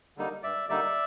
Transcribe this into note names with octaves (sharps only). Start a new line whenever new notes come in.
D3 G3 A#3 D#4
G2 D5 E5
D3 G3 A#3 D#4 D5 E5